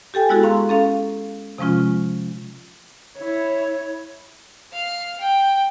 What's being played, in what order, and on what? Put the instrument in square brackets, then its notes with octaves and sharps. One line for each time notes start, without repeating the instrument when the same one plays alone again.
[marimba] G4 A4 G5 G#5
G#3 B3 E4 F#4 G#4 A4
F5 A#5 C6 C#6
C#4 A4 F5
C3 F3 G#3 C#4 F4
[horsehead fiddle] E4 C#5
[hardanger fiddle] F5
G5